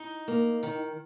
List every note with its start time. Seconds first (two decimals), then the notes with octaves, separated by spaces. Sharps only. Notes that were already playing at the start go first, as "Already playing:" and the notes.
Already playing: D#4
0.28 A#3
0.63 D#3